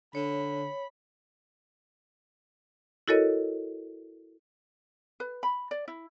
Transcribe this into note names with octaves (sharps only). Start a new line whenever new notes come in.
D3 C#5 B5
E4 F#4 A4 A#4 C#5 D#5
B4
B5
D5
E4